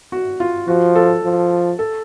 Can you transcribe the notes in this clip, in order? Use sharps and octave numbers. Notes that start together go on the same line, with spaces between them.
F#4
F4
F3 F#4
A4
F3
A4